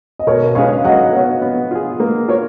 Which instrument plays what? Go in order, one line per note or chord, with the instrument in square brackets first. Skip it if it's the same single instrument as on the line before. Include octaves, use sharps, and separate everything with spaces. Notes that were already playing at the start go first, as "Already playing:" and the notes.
[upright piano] D#5
[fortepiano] B2 [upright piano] A#4 C#5
[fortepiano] G#3 C#4 G#4 B4 [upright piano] C#5 F5
[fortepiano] F#3 [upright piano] D#5 F#5
[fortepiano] B3 F#4 C#5
B3
F4 G#4
A#3
F4 A#4 C#5